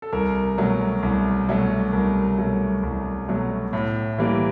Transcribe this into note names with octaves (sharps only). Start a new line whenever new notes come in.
A4
C2 A#4
B2 F#3 A3
C2
B2 F#3 A3
C2 A#4
B2 F#3 A3
C2
B2 F#3 A3
A2
E3 G3 A#3